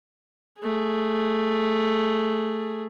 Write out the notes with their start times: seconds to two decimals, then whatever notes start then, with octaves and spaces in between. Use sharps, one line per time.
0.60 A3 G#4